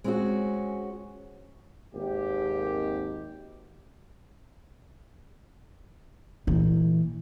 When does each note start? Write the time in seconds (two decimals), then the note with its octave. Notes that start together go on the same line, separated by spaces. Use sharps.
0.04 G#3 C4 C#4 E4 F#4
1.94 G#1 D#2 G4
6.47 A#2 E3